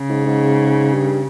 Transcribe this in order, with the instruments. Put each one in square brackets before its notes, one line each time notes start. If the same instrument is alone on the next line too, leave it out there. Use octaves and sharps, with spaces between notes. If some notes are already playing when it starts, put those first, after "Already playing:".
Already playing: [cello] C#3
[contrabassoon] G#2
G#2
G2